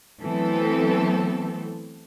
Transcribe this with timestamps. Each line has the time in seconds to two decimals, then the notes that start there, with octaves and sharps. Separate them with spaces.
0.21 E3 F#3 A3 B3 C4 A4